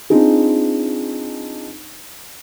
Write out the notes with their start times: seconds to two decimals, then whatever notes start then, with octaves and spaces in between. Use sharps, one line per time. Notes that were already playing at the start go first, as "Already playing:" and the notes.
0.10 C4 D4 D#4 F4 G#4